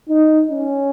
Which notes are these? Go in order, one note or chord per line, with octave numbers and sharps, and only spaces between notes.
D#4
C#4